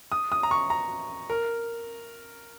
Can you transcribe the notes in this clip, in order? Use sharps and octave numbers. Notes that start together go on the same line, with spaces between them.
D#6
D#6
A#5
C#6
A#5
A#4